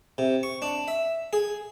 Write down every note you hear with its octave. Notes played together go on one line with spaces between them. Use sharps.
C3
C#6
D4
E5
G#4